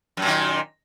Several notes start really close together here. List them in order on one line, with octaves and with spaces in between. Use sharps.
F#2 A#2 D#3